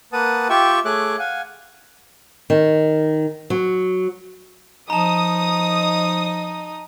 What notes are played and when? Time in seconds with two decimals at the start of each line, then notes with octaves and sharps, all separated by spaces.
0.13 A#3 B4 F#5 A5 D#6
0.49 F4 G4 E5 G5 C#6 E6
0.85 A3 G#4 C#5 E5 D6 F#6
1.19 F5 F#5 G#5
2.50 D#3
3.50 F#3
4.90 F3 D#4 A5 A#5 D#6